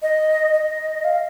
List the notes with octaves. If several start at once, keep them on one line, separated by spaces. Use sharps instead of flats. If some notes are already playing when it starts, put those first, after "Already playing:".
D#5
D#5
F5